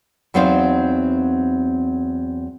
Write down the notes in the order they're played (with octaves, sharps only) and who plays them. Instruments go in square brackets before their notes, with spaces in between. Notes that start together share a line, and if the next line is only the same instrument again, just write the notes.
[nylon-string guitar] E2 F#3 B3 C4 D#4 F5